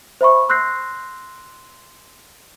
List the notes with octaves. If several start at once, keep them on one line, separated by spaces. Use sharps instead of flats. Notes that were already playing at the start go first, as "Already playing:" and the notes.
C5 E5 B5 C#6
C6 E6 F#6 G6 A#6 C7